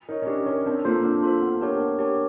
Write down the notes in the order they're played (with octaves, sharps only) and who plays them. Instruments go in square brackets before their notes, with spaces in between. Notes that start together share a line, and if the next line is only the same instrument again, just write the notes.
[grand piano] D#4 [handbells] A#4
[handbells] C#5
[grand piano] C#4
[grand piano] D4 [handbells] G4
[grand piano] C#4 [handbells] A#4 C#5
[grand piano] C4 [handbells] D4
[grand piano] A#3 [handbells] F4 A4 C5
[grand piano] A#3 [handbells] D4
[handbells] F4 A4 C5
B3
D4 G4 A#4 C#5
B3
D4 G4 A#4 C#5